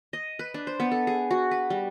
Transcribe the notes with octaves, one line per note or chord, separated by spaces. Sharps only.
D#5
B4
D4
C5
B3
A4
G#4
F#4
B4
G3